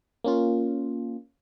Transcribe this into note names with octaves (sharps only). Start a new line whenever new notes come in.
A#3 C#4 F4